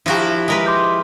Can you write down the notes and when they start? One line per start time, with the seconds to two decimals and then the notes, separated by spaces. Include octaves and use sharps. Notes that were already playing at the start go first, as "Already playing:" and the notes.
0.06 F3 E4 F#4 G4 A#4
0.48 G#3 A#4 B4
0.66 C6 D6 G6